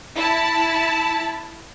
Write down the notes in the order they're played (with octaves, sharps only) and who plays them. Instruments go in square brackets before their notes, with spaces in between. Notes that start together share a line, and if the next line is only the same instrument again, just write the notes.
[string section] E4 A5